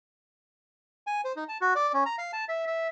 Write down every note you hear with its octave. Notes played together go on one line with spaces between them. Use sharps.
G#5
C5
D#4
A5
F#4
D5
C#4
A#5
F5
A5
E5
E5